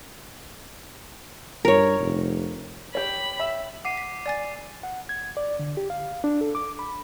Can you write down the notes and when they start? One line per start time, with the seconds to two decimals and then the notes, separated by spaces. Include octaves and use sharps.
1.65 G2 A#4 C#5
2.00 F1
2.95 G4 C#5 B5
3.39 E5
3.85 F#5 D6 C7 D#7
3.97 B6
4.26 D5 G#5 A6
4.83 F#5
5.09 G#6
5.37 D5
5.59 D3
5.77 G4
5.90 F5
6.24 D4
6.41 A4
6.55 D6
6.79 B5